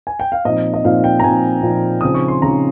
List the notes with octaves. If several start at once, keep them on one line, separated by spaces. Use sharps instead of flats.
G#5
G5
F5
A#2 F3 C4 D#4 D#5
D#5
A#2 F3 C4 D#4 F5
G5
A#5
A#2 F3 C4 D#4 G#5
A#2 F3 C4 D#4
C#3 F3 C4 D#4 D#6
C#6
C6
C#3 F3 C4 D#4 A#5